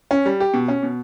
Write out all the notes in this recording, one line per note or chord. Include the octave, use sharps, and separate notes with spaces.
C#4
G3
G4
B2
C#4
B2